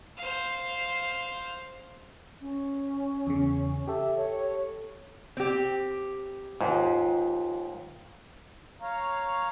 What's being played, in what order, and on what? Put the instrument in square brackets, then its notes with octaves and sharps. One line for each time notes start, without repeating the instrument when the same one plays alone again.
[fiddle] C5 F5
[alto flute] C#4
[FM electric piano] E2 C#3
[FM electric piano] G4 A4 [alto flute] E5
[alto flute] C#5
[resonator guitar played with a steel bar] C4 G4
[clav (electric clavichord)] D#2 G#2 [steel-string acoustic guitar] F4
[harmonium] C#5 F5 A#5